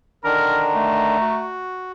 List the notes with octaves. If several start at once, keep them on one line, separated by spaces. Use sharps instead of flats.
D3 D#3 D4 A#4 A#5
A3
F#4